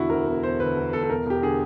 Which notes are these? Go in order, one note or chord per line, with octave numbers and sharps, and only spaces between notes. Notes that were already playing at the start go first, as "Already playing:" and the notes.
Already playing: E1 D3 E4 F#4
D2 A#4
E1
E1 C5
D2 B4
E1
E1 A4
A4
E1 A#4
E1 G4
D3 G#4